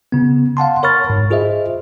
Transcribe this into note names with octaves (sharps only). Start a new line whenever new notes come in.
C#3 B3
F5 F#5 A5 C6
A#4 C#5 B5 C#6 F6 A6
G#2
F4 G#4 C5 D#5 E5